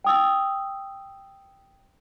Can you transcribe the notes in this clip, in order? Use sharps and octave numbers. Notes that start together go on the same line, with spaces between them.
G5 D#6 E6